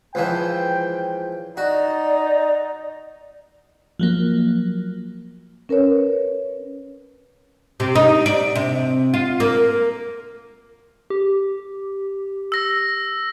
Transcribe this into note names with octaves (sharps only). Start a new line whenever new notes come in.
C#2 E3 F3 G5
D#4 F#4 D5
F3 F#3 A#3
C#4 A#4 B4 C#5
C3
D#4
D5
C3
F4
A#3
G4
E6 A#6